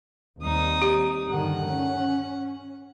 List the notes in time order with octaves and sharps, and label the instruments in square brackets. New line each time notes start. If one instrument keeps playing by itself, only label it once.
[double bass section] D#2 G3 C4 [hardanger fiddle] D#4 D#6
[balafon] G4
[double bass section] G2 D3 D#3 [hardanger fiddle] F#5
[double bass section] C#4